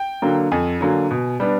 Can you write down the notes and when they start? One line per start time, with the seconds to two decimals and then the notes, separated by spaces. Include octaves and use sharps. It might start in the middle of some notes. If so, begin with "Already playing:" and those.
Already playing: G5
0.22 D3 F#3 A#3
0.52 F2 G#5
0.81 D3 F#3 A#3
1.11 B2
1.40 G3 B3 D4